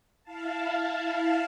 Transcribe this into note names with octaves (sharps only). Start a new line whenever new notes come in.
E4 F5 A5